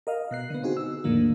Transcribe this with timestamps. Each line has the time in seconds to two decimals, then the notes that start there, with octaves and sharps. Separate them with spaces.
0.07 A#4 D#5 F5
0.31 B2 F#6 C7
0.50 D3 B3
0.63 C4 D#4 F#4 G#4
0.77 E6
1.04 E2 A2 D3 D#3 F3 A#3